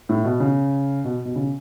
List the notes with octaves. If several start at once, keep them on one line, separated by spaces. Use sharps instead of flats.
A2
B2
C#3
B2
B2
C#3